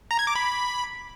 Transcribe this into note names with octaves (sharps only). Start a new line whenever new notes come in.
A#5
G#6
D6
B5